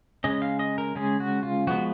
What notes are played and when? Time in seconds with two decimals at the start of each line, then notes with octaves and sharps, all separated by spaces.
0.24 C#3 G#3 C#4 D#5
0.42 F5
0.59 D#5
0.78 A#4
0.95 C#3 G#3 C#4 G#4
1.20 F#4
1.43 F4
1.67 F3 G#3 B3 F#4